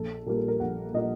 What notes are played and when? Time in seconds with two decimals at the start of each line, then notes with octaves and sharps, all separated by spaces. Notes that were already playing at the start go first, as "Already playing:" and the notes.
Already playing: A#1 A4
0.26 A#2 G3 A#3 A#4
0.37 A4
0.48 A#4
0.60 A#1 F#5
0.94 A#2 G3 A#3 D#5